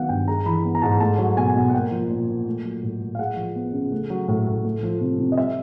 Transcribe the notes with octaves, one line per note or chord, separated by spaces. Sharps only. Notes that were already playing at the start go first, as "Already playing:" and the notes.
Already playing: D#3 F#3 B3 F5 F#5
G2 G5
G#3 A#5
E3 B5
B3
A#5
G#2 A5
A3 A5
F#3
B2 G#5
B2
F#5
A#3 G5
F3
A#2
A#2
A3
F#3
A2
A2
F5
G#3 F#5
F3
B3
C#3
A3
F#3
A2
A2
A3
F3
C3
C3
D#5
G3 E5